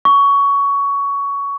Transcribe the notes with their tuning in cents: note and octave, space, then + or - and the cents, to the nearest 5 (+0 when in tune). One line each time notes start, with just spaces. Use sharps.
C#6 +20